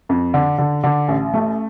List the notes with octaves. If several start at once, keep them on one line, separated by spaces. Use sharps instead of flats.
F2
D3
D3
D3
A1
A3